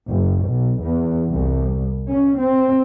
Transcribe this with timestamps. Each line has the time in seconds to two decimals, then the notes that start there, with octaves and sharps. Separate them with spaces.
0.10 F#1
0.49 B1
0.84 E2
1.31 C2
2.11 C#4
2.40 C4